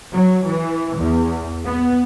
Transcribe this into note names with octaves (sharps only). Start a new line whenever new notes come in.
F#3
E3
E2
B3